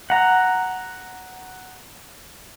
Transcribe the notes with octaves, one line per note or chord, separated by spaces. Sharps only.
F#5 A#5